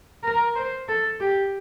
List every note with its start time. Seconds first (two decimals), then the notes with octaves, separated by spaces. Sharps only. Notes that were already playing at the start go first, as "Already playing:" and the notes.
0.23 A#4
0.55 C5
0.88 A4
1.20 G4